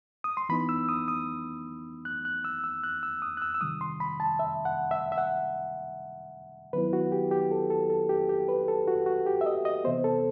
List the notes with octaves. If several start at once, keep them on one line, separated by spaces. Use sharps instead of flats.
D#6
C6
E3 B3 D#4 B5
E6
D#6
D#6
F#6
F#6
E6
E6
F#6
E6
D#6
F#6
E6
E6
C3 D#3 G3 D#6
C6
B5
A5
E5
F#5
E5
E5
F#5
D#3 F#3 B3 E4 B4
F#4
G4
G4
A4
A4
A4
G4
G4
B4
A4
F#4
F#4
G4
E5
D#5
D#5
C3 E3 B3 C5
A4